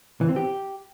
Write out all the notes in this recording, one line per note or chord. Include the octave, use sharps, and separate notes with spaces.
E3
C4
G4